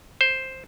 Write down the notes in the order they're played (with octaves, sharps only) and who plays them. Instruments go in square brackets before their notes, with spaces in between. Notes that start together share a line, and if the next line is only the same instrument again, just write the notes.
[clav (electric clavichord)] C5